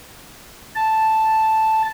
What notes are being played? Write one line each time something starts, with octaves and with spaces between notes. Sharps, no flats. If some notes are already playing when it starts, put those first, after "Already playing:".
A5